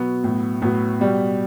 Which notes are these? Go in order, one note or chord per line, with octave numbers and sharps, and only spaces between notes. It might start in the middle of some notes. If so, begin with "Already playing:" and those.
Already playing: B2 F#3 B3
A2 F#3
A2 F#3 B3
B2 G3